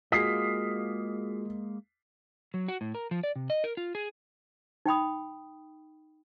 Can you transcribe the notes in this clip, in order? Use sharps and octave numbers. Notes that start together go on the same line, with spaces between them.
G#3 A#3 F4 F#4 G#4 D#5 B6 C7
F#3
F#4
A2
A#4
F3
D5
C3
D#5
A#4
F4
G#4
D#4 G5 B5 D#6